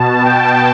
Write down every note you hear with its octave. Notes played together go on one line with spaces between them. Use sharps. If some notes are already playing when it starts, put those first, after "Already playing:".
Already playing: B2 A5
G5